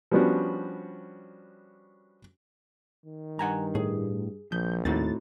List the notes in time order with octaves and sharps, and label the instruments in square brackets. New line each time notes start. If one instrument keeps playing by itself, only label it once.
[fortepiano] F3 G3 B3 C#4 D4 F#4
[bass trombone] D#3
[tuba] G2 [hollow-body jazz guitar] F#5 G#5 A#5
[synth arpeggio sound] A2 [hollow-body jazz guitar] G#4
[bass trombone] A#1 [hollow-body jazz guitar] F3 [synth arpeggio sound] G6
[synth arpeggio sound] D#2 A6 [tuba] A2 [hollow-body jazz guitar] C4 D#4 F#4